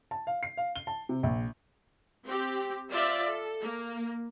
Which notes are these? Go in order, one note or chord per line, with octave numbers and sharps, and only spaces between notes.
A5
F5
C7
F5
G7
A5
C3
A#1
C4 G4
F4 C5 D5 E5 F5
A4
A#3